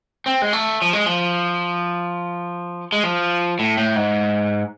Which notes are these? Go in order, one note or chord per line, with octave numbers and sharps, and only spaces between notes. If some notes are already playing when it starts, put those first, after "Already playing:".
C4
G#3
A3
F3
G#3
F3
G#3
F3
A2
A2
G#2